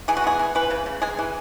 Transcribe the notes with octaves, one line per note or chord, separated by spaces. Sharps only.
E3 G#4
F#4
B3 G#4
E3
E3 B4
C#3
C#3
G#3 G#4
E3